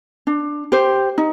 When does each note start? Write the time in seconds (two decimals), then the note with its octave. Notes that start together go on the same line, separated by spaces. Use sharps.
0.27 D4
0.72 G4 C5
1.18 D#4